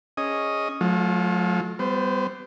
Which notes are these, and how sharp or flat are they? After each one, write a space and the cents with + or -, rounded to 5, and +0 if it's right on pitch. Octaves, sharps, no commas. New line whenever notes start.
C#4 +0 G#4 +0 D#5 +0
F#3 -40 A3 -35 F4 +0
G3 +0 B3 +30 C5 +0